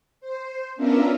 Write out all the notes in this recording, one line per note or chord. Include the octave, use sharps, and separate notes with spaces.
C5
B3 C#4 D4 F4 A#4 E5